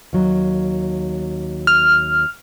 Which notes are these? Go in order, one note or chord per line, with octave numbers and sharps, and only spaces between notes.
D#2 F#3
F6